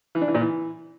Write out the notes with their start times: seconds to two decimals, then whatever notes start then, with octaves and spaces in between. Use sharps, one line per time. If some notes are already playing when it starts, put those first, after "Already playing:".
0.15 E3
0.21 D4
0.28 E3
0.34 A#2
0.41 E3